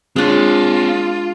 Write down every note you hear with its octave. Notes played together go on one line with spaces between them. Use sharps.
G#3 C4 D4 F4 C#5